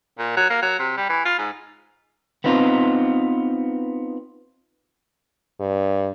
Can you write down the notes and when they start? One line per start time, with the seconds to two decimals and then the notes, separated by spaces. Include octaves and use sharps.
0.19 A#2
0.37 F#3
0.50 A#3
0.62 F#3
0.79 C3
0.97 G3
1.09 E3
1.25 F4
1.38 G#2
2.44 B3 C4 D#4 F4
5.60 G2